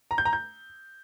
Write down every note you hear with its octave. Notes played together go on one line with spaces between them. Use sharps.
A#5
G6
A#5
G6